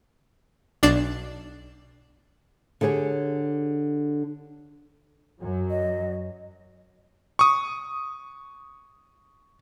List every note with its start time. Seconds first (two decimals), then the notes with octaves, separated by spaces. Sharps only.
0.83 B1 D4 D5 C7 E7
2.81 D3 G4 G#4 B4 C#5
5.41 F#2 F#3
5.70 D#5
7.39 C#6 D#6